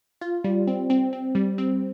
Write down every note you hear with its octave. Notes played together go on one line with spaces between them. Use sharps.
F4
G3
C4
C4
C4
G3
C4